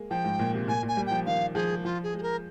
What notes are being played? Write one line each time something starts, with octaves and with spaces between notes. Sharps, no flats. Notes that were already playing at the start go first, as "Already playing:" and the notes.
Already playing: G#3 A#3
F3 G5
G#2
A#2
C3
A#2 G#5
A#2 G#5
G3
F3 G5
D#3 F5
F3 G#4
F3 F4
G#4
G#3 G#4
A#4